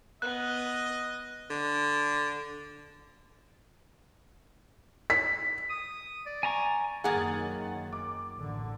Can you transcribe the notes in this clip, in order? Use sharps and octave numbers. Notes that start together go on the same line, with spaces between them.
B3 D#5 F#6
D3
B6
D#6
D5
G#5 A#5 C#6
F#2 D#3 A#3 G#4 F#5 G#6 A6
D6
A1 D3